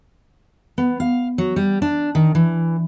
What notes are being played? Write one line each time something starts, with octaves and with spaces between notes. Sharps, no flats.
B3
F5
F#3
G3
D4
D#3
E3